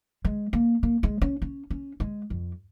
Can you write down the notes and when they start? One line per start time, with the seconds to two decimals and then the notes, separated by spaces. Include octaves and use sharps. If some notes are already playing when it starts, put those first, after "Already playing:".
0.25 G#3
0.53 A#3
0.83 A#3
1.03 G#3
1.21 C#4
1.42 C#4
1.70 C#4
2.00 G#3
2.30 F2